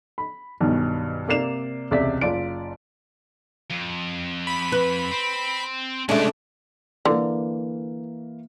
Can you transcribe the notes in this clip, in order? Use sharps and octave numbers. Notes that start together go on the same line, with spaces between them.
B5
B1 G2 B2 D#3
C3 A#3 D5 C7 E7 F7
E1 C#2 C3 D5 E5 B6
F#1 F4 D5 D7
F2
B5
B4
C4
C3 G#3 A3 C#4 D4 D5
D3 E3 A#3